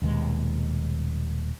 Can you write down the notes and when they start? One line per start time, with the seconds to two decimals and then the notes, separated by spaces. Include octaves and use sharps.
0.02 D#1 D#2 B2 G#3